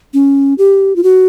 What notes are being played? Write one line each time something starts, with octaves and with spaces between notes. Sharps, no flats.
C#4
G4
F4
F#4